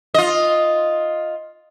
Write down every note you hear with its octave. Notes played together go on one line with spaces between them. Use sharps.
F4 D#5